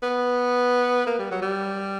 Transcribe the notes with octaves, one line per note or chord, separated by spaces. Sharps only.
B3
A#3
G3
F#3
G3